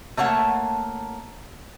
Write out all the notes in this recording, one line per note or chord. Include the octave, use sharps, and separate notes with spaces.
A3 A#3 C#5 F#5 A5